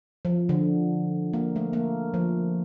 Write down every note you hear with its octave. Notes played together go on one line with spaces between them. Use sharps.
F3
D3
A#3
A3
A#3
F3